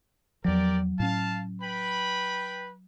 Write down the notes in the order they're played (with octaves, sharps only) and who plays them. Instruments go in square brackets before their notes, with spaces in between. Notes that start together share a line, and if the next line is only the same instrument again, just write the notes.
[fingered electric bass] E2 F3 [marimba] F#3 [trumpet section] G4 A#4 D5
[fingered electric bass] A2 C#4 [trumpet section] F5 A5
[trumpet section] B4 G5 B5